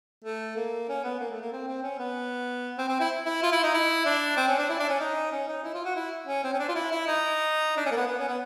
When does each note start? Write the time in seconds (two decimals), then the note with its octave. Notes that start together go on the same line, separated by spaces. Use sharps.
0.24 A3
0.56 A#3
0.89 C#4
1.04 B3
1.20 A#3
1.31 A3
1.41 A#3
1.52 C4
1.68 C4
1.83 C#4
1.99 B3
2.78 C4
2.88 C4
3.00 E4
3.26 E4
3.43 F4
3.52 E4
3.63 D#4
3.74 E4
4.05 D4
4.37 C4
4.48 C#4
4.58 D4
4.69 E4
4.80 D4
4.89 C#4
5.00 D#4
5.32 C#4
5.48 D#4
5.64 E4
5.74 F4
5.85 F#4
5.96 E4
6.27 C#4
6.44 C4
6.54 C#4
6.59 D4
6.69 F4
6.75 E4
6.92 E4
7.07 D#4
7.77 D4
7.86 C#4
7.91 A#3
7.97 B3
8.07 B3
8.18 C#4
8.28 B3